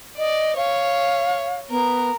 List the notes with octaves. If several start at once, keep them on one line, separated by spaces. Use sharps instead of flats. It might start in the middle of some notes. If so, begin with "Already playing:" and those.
D5 D#5
C#5 F5
B3 A#4